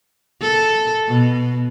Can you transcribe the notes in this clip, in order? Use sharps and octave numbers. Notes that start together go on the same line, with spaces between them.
A4
B2